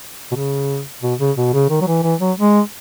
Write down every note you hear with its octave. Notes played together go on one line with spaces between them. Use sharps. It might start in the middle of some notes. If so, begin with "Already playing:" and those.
B2
C#3
B2
C#3
B2
C#3
D#3
F#3
E3
E3
F#3
G#3